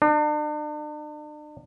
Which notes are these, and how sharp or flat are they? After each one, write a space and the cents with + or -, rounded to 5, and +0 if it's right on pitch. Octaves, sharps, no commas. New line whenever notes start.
D4 +40